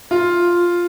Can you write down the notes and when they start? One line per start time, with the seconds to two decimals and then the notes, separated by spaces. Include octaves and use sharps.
0.11 F4